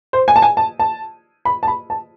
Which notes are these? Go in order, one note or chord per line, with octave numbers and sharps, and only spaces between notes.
C5
G#5
A5
G#5
A5
A5
B5
A5
B5
A5